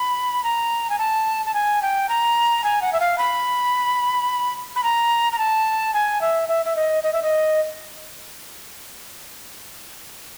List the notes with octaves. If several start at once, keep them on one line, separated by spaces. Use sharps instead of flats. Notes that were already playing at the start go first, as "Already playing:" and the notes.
Already playing: B5
A#5
G#5
A5
A5
G#5
G5
A#5
G#5
F#5
E5
F5
B5
B5
A#5
A#5
A5
G#5
E5
E5
E5
D#5
D#5
E5
D#5